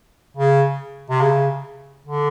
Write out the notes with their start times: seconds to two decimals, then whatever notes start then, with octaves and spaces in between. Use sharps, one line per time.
0.37 C#3
1.10 C3
1.21 C#3
2.06 D3